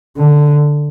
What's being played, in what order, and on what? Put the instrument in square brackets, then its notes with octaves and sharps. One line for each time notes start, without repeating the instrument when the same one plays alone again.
[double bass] D3